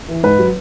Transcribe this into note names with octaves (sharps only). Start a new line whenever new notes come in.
E3
G#2 B4
F#3